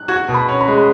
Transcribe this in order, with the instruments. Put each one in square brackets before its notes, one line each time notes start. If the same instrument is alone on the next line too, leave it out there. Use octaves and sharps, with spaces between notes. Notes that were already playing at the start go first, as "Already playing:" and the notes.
Already playing: [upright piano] F#6
[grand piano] F#4 [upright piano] G#6
[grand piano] B2
[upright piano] B5
[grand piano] C#4
[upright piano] B5
[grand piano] G#3
[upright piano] B5